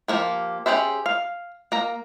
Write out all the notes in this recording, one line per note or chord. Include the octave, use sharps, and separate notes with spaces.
F3 A#3 G4
C#4 G4 G#4 C5 E5
F5
A#3 A#5